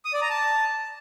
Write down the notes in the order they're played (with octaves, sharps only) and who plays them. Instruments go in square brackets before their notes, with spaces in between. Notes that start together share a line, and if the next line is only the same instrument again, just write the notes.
[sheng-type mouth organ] D#6
D5
A#5
A5